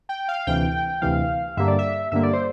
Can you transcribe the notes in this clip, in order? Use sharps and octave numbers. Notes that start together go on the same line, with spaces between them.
G5
F5
D2 C3 E3 G5
D2 C3 E3 F5
G2 D3 G3 A#3 E5
D5
E5
G2 D3 G3 A#3 E5
D5
C5